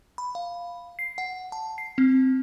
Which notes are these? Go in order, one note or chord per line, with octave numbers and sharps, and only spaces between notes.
B5
F5
C7
F#5
A5
C7
C4